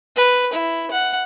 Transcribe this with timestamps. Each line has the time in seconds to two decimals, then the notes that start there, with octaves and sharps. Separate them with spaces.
0.17 B4
0.53 E4
0.91 F#5